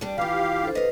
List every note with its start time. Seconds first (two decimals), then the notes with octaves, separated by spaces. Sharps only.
0.01 G3 D4
0.18 E3 F4 G4 F5
0.63 D4 A4 C5
0.75 B4 D#5 F5